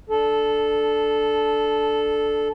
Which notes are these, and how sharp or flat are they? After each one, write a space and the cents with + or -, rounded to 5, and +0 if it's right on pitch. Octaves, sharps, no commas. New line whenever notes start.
D4 +0 A4 -10